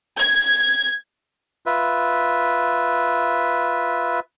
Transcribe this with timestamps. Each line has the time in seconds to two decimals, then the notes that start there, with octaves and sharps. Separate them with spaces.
0.20 G#6
1.66 F4 B4 E5